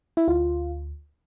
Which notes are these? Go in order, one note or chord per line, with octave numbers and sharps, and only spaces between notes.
E4
D2 F4